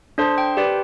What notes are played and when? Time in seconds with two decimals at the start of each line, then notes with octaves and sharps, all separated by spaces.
0.18 D4 A4 C5
0.38 G5
0.57 G4 B4 D5